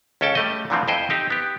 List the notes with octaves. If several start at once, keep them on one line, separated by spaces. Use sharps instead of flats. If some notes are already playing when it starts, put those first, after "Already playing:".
C#2 C#4 A4 G5 A5
G3 A3 D#5
A#2 D3 E3 F3 A3 C4
F2 E4 C5 D#5 G5
C4 D#4 G4
B3 G4